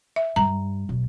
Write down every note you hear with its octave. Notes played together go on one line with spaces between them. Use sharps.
E5
G2 G3 A#5
D1 B1